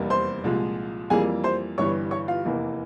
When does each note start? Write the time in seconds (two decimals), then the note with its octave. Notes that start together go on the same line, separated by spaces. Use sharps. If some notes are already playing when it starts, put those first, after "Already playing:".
Already playing: F1 E2 C3 G3 A#3
0.10 C5 C6
0.44 C2 A#2 F3 G#3
1.10 F2 E3 G3 A#3 G#4 G#5
1.44 C5 C6
1.78 G1 G2 E3 G3 C#5 C#6
2.11 C#5 C#6
2.28 F4 F5
2.44 F1 E2 E3 A#3